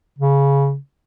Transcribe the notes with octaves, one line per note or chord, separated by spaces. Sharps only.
C#3